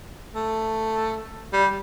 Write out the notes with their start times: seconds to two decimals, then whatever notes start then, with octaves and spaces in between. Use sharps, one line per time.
0.35 A3
1.53 G3